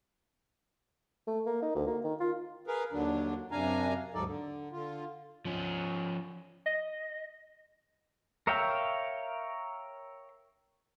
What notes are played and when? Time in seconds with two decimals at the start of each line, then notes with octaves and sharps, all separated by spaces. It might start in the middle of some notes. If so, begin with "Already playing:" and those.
1.27 A3
1.46 A#3
1.62 D#4
1.75 D2
1.87 A#3
2.04 D#3
2.20 F4
2.67 G#4 A#4 B4 F5
2.92 D#2 D3 F#3 D4
3.51 F#2 C3 D4 F5 G#5 A#5
4.14 D#2 G#2 F#3 D#4 A4 D5
4.25 D3
4.72 D3 F4
5.45 F3 C#4
6.66 D#5
8.47 A#4 C#5 E5 F5 G5